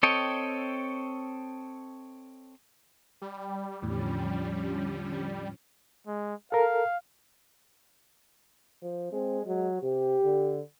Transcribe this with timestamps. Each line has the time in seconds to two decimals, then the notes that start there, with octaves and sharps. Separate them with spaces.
0.03 C4 A4 C#5 D#5 G5
3.22 G3
3.83 E2 A2 D3 F3 C#4
6.07 G#3
6.52 A4 A#4 F5
8.82 F3
9.12 G#3 C4
9.46 F#3 G#3
9.82 C3 G4
10.24 D3